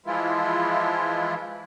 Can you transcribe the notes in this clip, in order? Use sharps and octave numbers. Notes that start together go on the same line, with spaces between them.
E3 F3 G#3 E4 F4